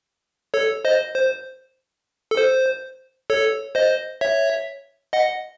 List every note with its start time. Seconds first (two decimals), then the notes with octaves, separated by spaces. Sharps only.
0.54 A4 C#5
0.85 C5 D#5
1.15 C5
2.31 A4
2.37 C5
3.30 A4 C#5
3.75 C5 D#5
4.21 C#5 E5
5.13 D#5 F#5